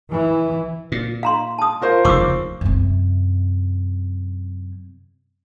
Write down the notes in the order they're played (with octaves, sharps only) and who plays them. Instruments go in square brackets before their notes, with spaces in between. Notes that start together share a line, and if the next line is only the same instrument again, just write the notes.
[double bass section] E3
[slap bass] A#2
[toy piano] F5 A#5 C6
A5 D#6
[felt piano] F4 A#4 C5
[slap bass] F1 D#2 C#3 [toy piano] C#6 D6 E6
[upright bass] F#2 C3